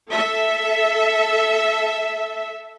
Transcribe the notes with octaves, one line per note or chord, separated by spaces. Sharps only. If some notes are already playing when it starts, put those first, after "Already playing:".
A4 E5